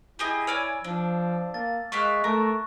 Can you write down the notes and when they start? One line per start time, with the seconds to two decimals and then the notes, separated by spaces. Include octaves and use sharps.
0.19 E4 G4 G#4 D#5
0.47 C#5 D5 G#5 E6 F6
0.84 F3 D4
1.54 A#3 A6
1.92 G#3 A#3 E5 F5 C#6 F6 F#6
2.24 A3 A#4